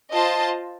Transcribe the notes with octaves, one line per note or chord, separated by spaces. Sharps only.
F4 C5 D#5 A5